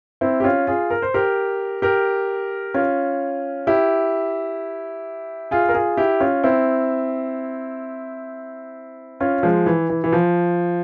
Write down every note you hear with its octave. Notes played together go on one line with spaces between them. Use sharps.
C4 E4
G4
C#4 F4
F4 G#4
A#4
C5
G4 A#4
G4 A#4
C#4 F4
E4 G4
F4 G#4
A#4
F4 G#4
E4 G4
C#4 F4
C4 E4
C#4 F4
F3 G#3
E3
E3
E3
F3